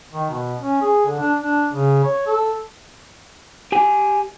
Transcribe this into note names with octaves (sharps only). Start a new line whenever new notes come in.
D#3
B2
C#4
G#4
D3
D4
D4
C#3
C#5
A4
G4 G#5